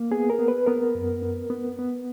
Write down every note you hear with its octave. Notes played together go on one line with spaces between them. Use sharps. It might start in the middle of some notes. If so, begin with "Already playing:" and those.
Already playing: A#3
B3 G#4
A#4
B3
B4
B3 A#4
F#2
B3
B3
B3